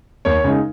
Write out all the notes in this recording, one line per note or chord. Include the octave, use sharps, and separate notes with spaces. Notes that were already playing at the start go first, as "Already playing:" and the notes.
D#2 C#5
C#3 G#3 D#4